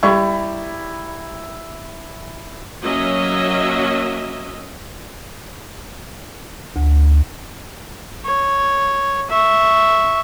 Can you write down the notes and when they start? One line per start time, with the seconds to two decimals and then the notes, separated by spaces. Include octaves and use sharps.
0.03 G3 E4 A#5 C#6
2.82 F#3 A#3 C#4 D#5 E5
6.76 D2
8.25 C#5
9.30 E5 C#6